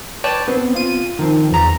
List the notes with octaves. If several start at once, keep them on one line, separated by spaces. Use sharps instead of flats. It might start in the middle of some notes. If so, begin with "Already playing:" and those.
B4 C#5 D5 G5 A5
B3 C4
F4 D#7
D#3 F3 C4
E2 A#5